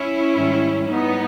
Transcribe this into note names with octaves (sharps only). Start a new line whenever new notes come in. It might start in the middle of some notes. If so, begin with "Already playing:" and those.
Already playing: C#4 E4
G#2 D#3 G3
G#2 G3 B3 D#4